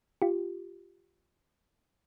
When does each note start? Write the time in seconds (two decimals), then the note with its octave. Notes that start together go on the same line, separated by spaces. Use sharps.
0.22 F4 G4